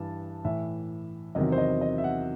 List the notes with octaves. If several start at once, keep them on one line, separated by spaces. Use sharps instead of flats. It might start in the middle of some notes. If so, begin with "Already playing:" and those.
Already playing: G2 E3 A5
A2 E3 E5
E2 C3 D#3 F#3 D#5
C5
D#5
D#5
E5
F#5